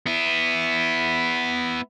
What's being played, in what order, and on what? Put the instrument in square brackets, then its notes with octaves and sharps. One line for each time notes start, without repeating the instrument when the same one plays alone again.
[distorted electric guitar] B3 E4